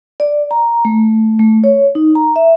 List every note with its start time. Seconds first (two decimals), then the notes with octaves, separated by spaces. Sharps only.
0.20 D5
0.51 A#5
0.85 A3
1.39 A3
1.64 C#5
1.95 D#4
2.15 A#5
2.36 E5